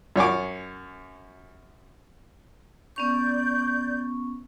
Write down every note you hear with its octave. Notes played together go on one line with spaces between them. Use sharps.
F#2 C#5 G#5 D6
B3 C#4 D5 C#6 G6